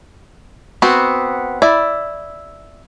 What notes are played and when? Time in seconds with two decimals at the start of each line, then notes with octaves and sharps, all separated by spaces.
0.82 B3 C4 F#4
1.62 E4 D5